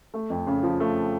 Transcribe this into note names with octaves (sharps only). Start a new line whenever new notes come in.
A3
F2
C#3
F3
A3